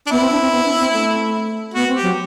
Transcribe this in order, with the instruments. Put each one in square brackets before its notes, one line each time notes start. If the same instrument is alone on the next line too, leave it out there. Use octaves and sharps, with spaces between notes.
[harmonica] D4
[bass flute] B3 [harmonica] E4
[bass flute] C4
D4
C4
B3
D4
B3
C4
A3
[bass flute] B3 [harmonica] F#4
[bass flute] C4
[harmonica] G4
[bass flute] F#3